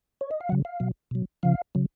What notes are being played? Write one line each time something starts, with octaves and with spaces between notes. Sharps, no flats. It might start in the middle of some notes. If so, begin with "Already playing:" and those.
C#5
D#5
F5
C#3 F#3 F#5
F5
B2 F#3
B2 F#3
C#3 F3 F5
C#3 F#3